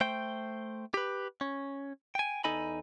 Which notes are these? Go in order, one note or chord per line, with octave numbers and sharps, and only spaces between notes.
A3 C5 G5
G4 B4
C#4
G5 G#5
E2 D#4 A4 D#5 G#5 B5